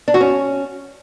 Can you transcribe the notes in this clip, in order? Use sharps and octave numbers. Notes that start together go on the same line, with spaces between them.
D4
F#4
C#4